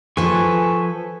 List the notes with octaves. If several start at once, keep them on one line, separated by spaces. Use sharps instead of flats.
F3 A4 B4 G#5 C#6